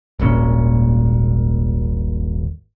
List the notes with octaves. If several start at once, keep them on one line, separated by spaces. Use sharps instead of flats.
D#1 G#1 A#2 C#4